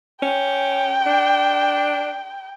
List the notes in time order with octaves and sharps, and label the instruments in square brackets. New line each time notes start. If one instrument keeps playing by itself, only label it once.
[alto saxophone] C#4 [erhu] G5
[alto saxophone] D4